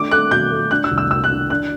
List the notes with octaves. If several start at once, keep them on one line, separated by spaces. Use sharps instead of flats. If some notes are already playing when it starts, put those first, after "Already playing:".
Already playing: A3 D4 D6
A3 F#6
B2 G6
A3
D4 F#6
E6
C2
E6
C2 E6
F#6
D4
D4 F#6